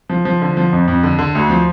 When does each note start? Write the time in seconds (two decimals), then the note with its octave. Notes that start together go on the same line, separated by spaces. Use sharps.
0.09 F3
0.25 F3
0.42 D3
0.57 F3
0.73 F2
0.88 F2
1.03 D3
1.19 D3
1.35 D2
1.50 F3